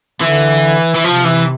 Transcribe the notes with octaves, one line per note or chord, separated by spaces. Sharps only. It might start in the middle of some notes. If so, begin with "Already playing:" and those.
D3 E3
E3
C3 F3
E3